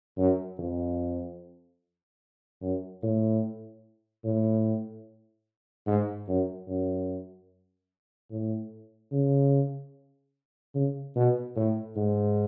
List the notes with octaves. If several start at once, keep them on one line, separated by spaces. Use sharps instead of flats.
F#2
F2
F#2
A2
A2
G#2
F#2
F#2
A2
C#3
C#3
B2
A2
G#2